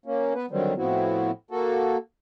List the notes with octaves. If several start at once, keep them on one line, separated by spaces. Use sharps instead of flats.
A#3 C#4
B3 B4
D3 D#3 F#3 G3 C4
A2 F3 B3 C4 E4 F#4
A#3 F#4 A4